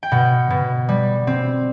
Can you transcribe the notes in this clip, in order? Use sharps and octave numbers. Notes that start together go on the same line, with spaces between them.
G5
B2 F#5
B2
G3
C4